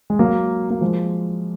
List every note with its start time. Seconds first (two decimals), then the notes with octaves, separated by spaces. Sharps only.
0.10 G#3
0.19 F#3 A#3
0.70 A#3
0.81 F3 G#3